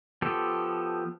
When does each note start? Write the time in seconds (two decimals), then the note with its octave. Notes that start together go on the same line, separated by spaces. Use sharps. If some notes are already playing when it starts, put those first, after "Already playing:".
0.22 F3 B3 G4 A4